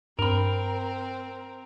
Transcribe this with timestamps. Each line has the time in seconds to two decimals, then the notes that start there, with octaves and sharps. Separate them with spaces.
0.19 G2 C4 A#4 B5